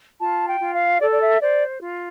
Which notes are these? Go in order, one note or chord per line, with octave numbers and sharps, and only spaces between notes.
F4 A5
G5
F4
F5
A4 D5
D5
E5
C5 D5
F4